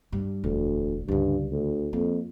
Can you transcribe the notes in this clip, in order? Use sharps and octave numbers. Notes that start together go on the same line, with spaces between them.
G2 G3
E1 D2
C#2 G2 D3
D2
F2 A#3